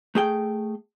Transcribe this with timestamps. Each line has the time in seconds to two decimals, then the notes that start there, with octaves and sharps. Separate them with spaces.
0.15 A3 G#4 G5